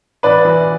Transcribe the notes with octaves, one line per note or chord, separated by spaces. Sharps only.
A1 B4 D5
E3